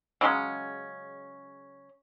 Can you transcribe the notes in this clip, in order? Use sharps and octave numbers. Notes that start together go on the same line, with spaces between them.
C#3 F#3 G#3 C#4